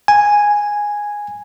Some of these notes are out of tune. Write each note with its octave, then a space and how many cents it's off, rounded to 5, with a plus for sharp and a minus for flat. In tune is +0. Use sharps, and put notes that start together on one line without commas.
G#5 -5